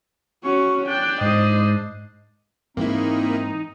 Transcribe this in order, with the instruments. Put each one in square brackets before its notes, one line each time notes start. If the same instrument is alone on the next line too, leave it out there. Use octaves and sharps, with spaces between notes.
[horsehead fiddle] C#4 F#4 [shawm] C#6
[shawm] D4 [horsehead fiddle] G5 [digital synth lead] F#6
[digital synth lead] G#2 [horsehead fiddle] C5 D#5
[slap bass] G#2 E3 G#3 [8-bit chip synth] A#3 E4 [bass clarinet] C4 [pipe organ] D#4